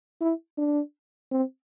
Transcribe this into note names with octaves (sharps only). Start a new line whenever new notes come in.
E4
D4
C4